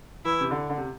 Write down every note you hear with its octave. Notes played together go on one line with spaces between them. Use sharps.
E3 E4
C3
D3
D3
C3